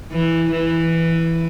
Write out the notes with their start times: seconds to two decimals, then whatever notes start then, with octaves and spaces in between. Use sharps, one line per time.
0.12 E3
0.51 E3